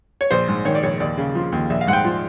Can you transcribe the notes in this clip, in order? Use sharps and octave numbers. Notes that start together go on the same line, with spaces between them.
C#5
A#1 C5
G#2
D#3 C#5
D5
A#1 C#5
D#2 D5
C#3
F3
D#2
A#1 E5
F5
G#2 F#5
G5
F3